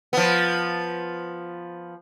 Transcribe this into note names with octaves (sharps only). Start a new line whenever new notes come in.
F3 B3